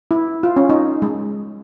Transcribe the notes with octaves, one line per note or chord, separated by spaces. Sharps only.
E4
F4
C#4
D#4
G#3